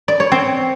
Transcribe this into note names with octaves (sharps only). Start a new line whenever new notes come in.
D5
C#5
C4